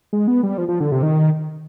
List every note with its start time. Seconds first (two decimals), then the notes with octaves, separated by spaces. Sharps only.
0.13 G#3
0.28 B3
0.43 G3
0.58 F3
0.68 F3
0.80 D3
0.92 C3
1.03 D#3